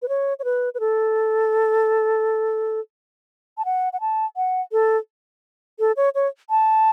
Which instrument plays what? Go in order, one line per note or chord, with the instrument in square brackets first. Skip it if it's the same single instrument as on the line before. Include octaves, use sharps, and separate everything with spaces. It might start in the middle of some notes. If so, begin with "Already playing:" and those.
[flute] B4
C#5
C#5
B4
B4
A4
A5
F#5
F#5
A5
F#5
A4
A4
C#5
C#5
A5